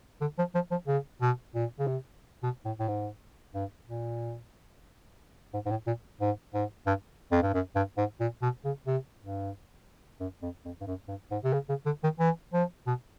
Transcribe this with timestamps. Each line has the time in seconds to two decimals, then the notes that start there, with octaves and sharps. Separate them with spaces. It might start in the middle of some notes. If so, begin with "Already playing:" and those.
0.21 D3
0.38 F3
0.55 F3
0.71 F3
0.87 C#3
1.21 B2
1.55 A#2
1.79 C#3
1.87 C3
2.43 B2
2.65 A2
2.80 A2
2.88 G#2
3.54 G2
3.87 A#2
5.54 G#2
5.66 G#2
5.71 A2
5.87 A#2
6.21 G#2
6.54 G#2
6.87 G2
7.32 F2
7.42 G2
7.54 F#2
7.75 G2
7.97 G#2
8.20 A#2
8.42 B2
8.64 C#3
8.87 C3
9.20 G2
10.20 F#2
10.42 F2
10.65 F2
10.81 G2
10.87 F#2
11.08 G2
11.31 G#2
11.44 C3
11.53 C#3
11.69 C#3
11.86 D3
12.04 D#3
12.20 E3
12.53 F3
12.87 B2